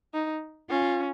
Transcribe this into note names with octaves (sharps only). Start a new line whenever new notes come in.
D#4
C#4 F4